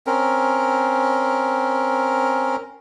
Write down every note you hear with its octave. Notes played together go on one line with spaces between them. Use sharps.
C4 C#4 A#4